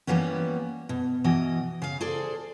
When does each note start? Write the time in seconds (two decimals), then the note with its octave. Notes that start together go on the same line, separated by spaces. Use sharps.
0.07 E3 G3 A#3 B3 C#4
0.89 B2
1.24 B2 E3 D#5
1.82 C#3 F5
2.01 G#4 A4 C5 D5